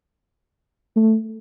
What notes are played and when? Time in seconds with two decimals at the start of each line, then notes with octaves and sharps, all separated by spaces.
0.96 A3